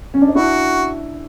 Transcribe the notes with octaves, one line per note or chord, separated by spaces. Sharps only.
C#4
D4
D#4
D4 E4 F#4